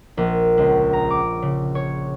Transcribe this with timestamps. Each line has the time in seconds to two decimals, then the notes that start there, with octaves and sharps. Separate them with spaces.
0.17 A#1
0.58 C#2
0.93 A#5
1.10 D6
1.42 C#3
1.75 C#5